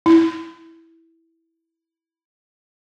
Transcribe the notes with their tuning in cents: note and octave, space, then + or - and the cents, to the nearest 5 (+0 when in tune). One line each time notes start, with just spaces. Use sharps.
E4 -5